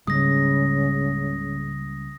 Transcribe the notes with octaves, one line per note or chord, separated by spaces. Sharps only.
C#2 G#2 C#3 G3 A#3 D#6 A#6